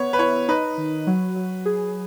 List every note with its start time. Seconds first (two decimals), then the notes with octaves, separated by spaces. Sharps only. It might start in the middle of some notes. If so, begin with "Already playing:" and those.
Already playing: B3 C#5
0.13 B4
0.19 E4 C#5
0.48 D#4 B4
0.78 D#3
1.07 F#3
1.36 F#3
1.65 G#4